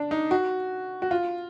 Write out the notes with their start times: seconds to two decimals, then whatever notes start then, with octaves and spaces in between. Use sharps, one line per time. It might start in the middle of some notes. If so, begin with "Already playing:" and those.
Already playing: D4
0.11 D#4
0.31 F#4
1.02 F#4
1.11 F4